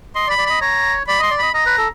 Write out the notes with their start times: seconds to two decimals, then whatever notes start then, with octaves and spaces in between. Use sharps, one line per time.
0.15 D#5 C6
0.27 D5
0.30 B5
0.38 D5
0.46 D#5 B5
0.61 C#5 A#5
1.08 D5 B5
1.19 D#5 C6
1.31 D5
1.38 D#5 B5
1.54 D#5 A#5
1.66 B4
1.78 A4